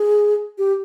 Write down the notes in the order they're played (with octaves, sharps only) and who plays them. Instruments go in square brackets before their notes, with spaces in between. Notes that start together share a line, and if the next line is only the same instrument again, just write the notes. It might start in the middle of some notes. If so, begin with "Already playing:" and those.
Already playing: [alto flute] G#4
G4